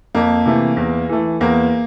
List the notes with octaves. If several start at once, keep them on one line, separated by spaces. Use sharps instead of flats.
F2 A#3
C3 E3 A3
E2
E3 A3
E2 A#3